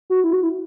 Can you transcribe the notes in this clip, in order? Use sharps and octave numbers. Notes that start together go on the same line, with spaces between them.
F#4
E4
F#4
E4